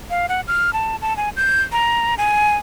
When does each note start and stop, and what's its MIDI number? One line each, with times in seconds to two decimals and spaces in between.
0.10 0.26 77
0.29 0.41 78
0.48 0.73 89
0.73 0.96 81
1.02 1.16 81
1.17 1.29 80
1.36 1.62 91
1.72 2.15 82
2.18 2.57 80